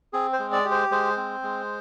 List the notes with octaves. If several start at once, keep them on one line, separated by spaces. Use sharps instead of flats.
C4 G#4
C5
G#3
D5
G4
C5
G#3 C5
C4
G#3